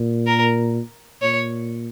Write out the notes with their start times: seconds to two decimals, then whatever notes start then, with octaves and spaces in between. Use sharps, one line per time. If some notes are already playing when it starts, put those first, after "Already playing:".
Already playing: A#2
0.27 A#4
1.22 A#2 C#5